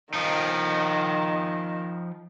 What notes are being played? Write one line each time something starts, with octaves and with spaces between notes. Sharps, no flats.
D#3 F3 D#4